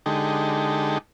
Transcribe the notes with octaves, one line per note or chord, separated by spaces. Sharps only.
D3 G#3 D#4 G4 A4